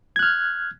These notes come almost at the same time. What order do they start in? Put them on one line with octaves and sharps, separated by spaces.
G#6 F#6 F6